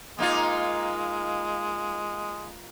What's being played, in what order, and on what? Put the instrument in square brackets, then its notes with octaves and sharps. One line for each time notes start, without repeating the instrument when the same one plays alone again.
[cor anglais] G#3 [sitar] A#3 D#4 F4